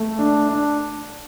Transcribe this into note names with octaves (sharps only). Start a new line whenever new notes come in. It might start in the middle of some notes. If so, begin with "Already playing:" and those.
Already playing: A3
D4
D4